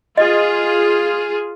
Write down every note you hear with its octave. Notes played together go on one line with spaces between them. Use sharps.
F4 G#4 D#5